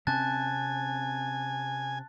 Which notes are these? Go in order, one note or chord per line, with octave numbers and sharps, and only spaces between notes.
C3 C4 C#4 G#5 A5 F#6 A6